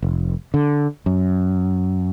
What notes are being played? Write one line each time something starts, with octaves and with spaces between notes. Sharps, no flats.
F1
D3
F#2